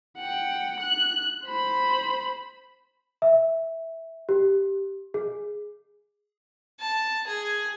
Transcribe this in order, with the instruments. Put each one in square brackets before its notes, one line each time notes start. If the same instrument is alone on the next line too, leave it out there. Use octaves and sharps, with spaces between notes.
[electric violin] F#5 G5
F#6
C5 B5
[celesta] E5
G4
G#4
[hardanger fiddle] A5
G#4